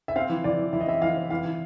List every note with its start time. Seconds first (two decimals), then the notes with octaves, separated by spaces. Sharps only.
0.08 E5
0.16 C4 F5
0.29 E3
0.44 E3 D5
0.59 E3
0.73 E3 E5
0.81 D#5
0.87 C4 E5
1.01 E3 F5
1.17 C4
1.30 E3 F5
1.45 E3